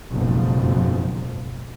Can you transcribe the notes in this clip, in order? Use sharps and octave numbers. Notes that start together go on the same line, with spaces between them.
F#1 B1 F2 G#2 F3